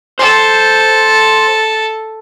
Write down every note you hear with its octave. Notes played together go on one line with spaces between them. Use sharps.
A4 C5